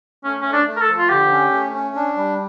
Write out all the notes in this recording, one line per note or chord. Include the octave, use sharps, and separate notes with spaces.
A3 C#4
A3 C#4
D4
A3
A#4
A4
F3
F4
D3 G4
C#4
A3
C#4
D4
G3